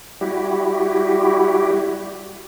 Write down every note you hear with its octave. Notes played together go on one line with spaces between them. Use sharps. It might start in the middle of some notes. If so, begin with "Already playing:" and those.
G3 E4 F#4 G4